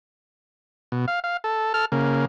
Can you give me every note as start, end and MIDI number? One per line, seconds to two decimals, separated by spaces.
0.92 1.06 47
1.08 1.20 77
1.24 1.37 77
1.44 1.73 69
1.74 1.85 69
1.74 1.85 89
1.92 2.25 49
1.92 2.25 58